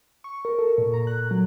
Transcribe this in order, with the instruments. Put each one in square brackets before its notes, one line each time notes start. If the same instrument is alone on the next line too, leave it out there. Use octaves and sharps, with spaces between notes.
[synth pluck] C#6
A#4
A4
A#2
A#5
F#6
F#3